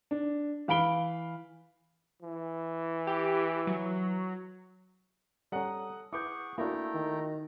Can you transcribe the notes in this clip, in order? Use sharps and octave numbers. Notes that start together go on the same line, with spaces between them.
D4
E3 F5 B5 D7 G7
E3
G4
F#3
G3 C#4 A4 F#5 A#5 D#6
E4 G#4 B4 F#5 C#6 D6 G6
A3 A#3 D4 E4 F#4 G5 A#5
D#3